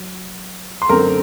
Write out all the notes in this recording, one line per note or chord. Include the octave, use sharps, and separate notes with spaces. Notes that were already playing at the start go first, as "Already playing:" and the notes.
Already playing: F#3
C6
F#2 D3 A3 C4 A#4 A#5